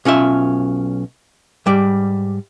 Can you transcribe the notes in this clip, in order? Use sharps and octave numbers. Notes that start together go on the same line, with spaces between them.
B1 C#4 F4 E5
G#2 G3 D5